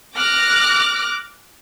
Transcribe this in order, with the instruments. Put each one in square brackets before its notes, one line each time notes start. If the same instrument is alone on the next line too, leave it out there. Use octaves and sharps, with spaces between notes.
[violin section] D6 F6 F#6 A#6